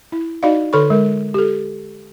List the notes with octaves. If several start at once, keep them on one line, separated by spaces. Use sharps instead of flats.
E4
D#4 F#4 D5 D#5 F5
D3 A4 C#5 B5 C#6
G#3 A#4
G4 A4